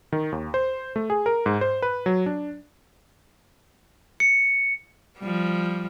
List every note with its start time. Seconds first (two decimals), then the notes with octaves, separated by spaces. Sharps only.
0.12 D#3
0.32 D#2
0.54 C5
0.96 A3
1.10 G#4
1.26 A#4
1.46 G#2
1.61 C5
1.82 B4
2.06 F#3
2.26 D4
4.20 C#7
5.19 F3 G3